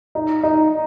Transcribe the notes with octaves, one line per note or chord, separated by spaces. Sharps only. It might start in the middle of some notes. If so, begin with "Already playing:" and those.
D#4
D#4